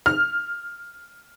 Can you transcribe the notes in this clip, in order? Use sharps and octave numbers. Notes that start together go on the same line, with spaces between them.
F6